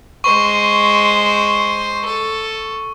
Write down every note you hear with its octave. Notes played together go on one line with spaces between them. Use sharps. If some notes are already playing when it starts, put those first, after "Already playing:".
G#3 C5 C#6
A4